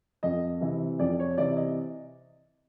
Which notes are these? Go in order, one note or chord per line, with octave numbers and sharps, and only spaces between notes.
F2 D#5
C3 E3
F2 D5
C#5
C3 E3 D5
D#5